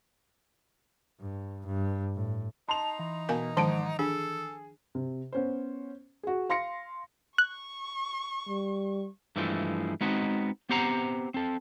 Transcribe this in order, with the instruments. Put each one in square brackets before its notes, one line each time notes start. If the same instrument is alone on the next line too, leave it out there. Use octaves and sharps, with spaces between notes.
[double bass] G2
G2
A2
[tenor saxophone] D#4 [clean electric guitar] A5 [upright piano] C6 F7
[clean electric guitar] E3
[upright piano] B2 [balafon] A#4 F5 G#5
[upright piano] G#2 D7 [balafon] D#3 F3 A5
[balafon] D4 [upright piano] G#4 [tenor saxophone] A4
[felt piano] C3
B3 C#4 C5
F#4 G#4
F5 C6 A#6 C#7
[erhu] C#6 [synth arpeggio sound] F#6
[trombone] G3
[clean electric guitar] G2 E3 F3 G#3 A3
G#3 B3 C4 D#4 F#4
B3 C4 G4 C5 F#5 A#5
C4 A4